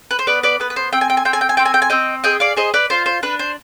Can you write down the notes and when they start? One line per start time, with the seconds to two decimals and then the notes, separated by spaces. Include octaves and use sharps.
0.11 B4
0.19 C5
0.27 B3 B4 D5
0.43 B4 D5
0.60 B3 B4
0.70 B4
0.76 C5
0.93 C4 G5
1.01 G#5
1.10 G5
1.17 G#5
1.25 C4 G5
1.33 G#5
1.41 G5
1.49 G#5
1.57 C4 G5
1.65 G#5
1.74 G5
1.82 G#5
1.90 C4 D#5 G5
2.24 G#4 D#5 G5
2.40 D5 F5
2.56 G#4 C5 D#5
2.74 B4 D5
2.90 F4 C5
3.06 C5
3.23 D4 B4
3.39 C5